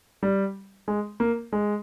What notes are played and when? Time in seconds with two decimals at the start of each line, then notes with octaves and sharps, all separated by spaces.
0.23 G3
0.88 G#3
1.20 A#3
1.53 G#3